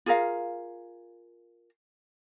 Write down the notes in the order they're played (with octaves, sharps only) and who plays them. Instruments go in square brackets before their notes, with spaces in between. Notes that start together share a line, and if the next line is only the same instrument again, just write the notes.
[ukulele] F4 G#4 A#4 F5